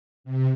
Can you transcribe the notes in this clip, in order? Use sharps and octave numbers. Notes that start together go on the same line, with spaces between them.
C3